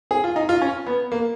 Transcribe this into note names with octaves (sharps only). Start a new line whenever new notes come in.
G#4
F4
D#4
F4
C#4
B3
A#3